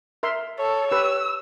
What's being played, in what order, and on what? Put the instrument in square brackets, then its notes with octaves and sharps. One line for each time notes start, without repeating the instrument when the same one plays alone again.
[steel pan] A#4 E5 C6
[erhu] A4 [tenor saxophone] C#5
[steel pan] G4 B4 [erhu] E6